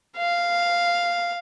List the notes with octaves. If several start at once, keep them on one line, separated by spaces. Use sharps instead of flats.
F5